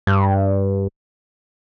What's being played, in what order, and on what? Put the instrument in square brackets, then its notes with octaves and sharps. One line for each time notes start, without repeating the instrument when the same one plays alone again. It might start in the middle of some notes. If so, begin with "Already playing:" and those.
[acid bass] G2